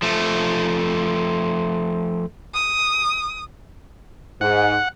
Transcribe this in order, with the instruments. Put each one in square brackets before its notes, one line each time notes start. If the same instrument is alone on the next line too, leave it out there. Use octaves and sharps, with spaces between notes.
[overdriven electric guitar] F3 A3
[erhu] D#6
[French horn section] G#2 [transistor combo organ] F#5